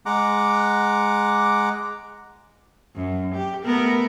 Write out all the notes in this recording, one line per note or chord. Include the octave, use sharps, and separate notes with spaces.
G#3 F#5 A#5 D6
F#2
G4
A3 B3 A#4